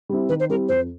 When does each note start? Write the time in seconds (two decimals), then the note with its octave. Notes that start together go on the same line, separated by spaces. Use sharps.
0.09 G3 C4 E4
0.29 D#3 B4
0.40 C5
0.49 G3 C4 E4 A#4
0.68 F2 C5